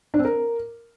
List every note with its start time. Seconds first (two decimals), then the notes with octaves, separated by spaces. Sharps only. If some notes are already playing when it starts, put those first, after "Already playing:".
0.14 D4
0.19 C4
0.25 A#4